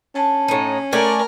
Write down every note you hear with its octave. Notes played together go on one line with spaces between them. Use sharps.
C#4 D4 A5
A2 D#4
A3 A#4 D5 G#5